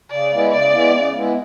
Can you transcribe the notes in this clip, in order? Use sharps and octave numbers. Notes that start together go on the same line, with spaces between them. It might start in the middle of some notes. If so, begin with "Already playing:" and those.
C#3 D5
G#3 B3 E4
C#3 D5
G#3 B3 E4
C#3
G#3 B3 E4